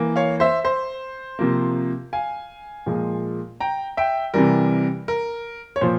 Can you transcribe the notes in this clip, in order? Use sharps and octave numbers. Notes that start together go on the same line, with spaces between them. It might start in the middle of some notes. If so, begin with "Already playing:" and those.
Already playing: E3 A#3
C#5 F5
C5 E5
C5
C3 F3 A#3
F5 G#5
A#2 F3 G#3
G5 A#5
E5 G5
C3 E3 G3 A#4
A#4
C#5
A#2 F3 C5